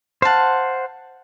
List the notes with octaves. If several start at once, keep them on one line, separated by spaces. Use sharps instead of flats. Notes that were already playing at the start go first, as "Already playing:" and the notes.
C5 F5 F#5 A5